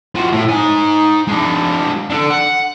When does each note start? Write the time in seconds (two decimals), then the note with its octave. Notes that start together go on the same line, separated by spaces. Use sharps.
0.15 F4 F#4
0.32 A2
0.49 D#4 G#5
1.27 G#3 D4
2.10 D4 A4
2.30 F#5